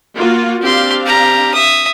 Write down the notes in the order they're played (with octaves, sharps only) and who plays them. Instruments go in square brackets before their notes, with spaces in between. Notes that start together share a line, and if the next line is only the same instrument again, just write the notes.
[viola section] A#3 F4 F#4
[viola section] C4 D4 F5 [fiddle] G4 C6
[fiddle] G4 A#5
E5 D#6